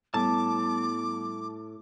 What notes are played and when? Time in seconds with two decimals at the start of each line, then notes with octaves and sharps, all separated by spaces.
0.14 A2 G3 B3 A5 D6